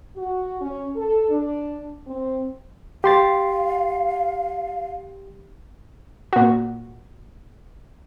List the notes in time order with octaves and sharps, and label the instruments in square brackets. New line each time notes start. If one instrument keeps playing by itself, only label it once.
[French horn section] F#4
C#4
A4
D4
C4
[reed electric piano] G4 C6 A6 [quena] F5
[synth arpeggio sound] A#2 F#4